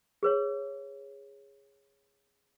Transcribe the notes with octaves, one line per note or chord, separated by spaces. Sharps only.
G#4 B4 C#5